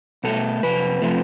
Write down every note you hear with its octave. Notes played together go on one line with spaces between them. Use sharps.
B2 A3 A4
F2 C3 B4
C3 F3 A3